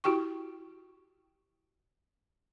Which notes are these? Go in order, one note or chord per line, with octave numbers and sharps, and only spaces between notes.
E4 F#4 G4 G5 C#6